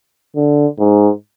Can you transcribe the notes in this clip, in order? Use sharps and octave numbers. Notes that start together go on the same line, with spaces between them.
D3
G#2